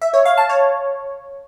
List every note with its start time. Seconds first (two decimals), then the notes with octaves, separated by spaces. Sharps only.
0.02 E5
0.14 C#5
0.25 F5
0.37 A5
0.49 C#5